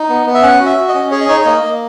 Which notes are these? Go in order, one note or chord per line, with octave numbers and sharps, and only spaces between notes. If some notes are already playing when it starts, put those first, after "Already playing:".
Already playing: D#4
B3
B3
E5
C#4 F#5
F#4
E5
F#4
D#5
C#4
G#4 C#5
D#5
D#4 C#5
C#5
A#3 D#5
A#3